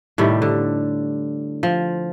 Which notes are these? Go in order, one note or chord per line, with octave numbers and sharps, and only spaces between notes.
A2 C3 D#3 G3
D3
F3